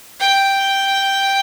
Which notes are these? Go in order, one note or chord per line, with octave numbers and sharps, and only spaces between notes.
G5